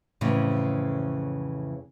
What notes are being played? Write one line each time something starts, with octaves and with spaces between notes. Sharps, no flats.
F2 A2 C#3 E3